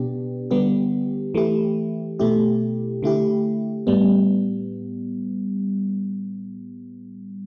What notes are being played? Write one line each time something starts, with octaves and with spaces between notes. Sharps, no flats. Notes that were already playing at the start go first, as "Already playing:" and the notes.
Already playing: B2 B3 D4 G4
D3 G3 B3 G4
E3 A3 E4 G4
B2 A3 E4 G4
D3 A3 E4 G4
A2 G3 B3